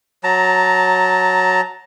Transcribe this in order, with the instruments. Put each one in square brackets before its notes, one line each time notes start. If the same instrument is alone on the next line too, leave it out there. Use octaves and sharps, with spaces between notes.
[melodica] F#3 A5 A#5